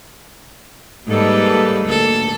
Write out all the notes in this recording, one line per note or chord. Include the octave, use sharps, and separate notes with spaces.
G#2 G3 A#3 A4 B4
D2 A#3 A4